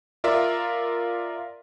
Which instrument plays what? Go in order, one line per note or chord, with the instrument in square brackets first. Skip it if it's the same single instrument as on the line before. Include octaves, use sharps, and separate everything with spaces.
[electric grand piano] F4 A#4 D5 E5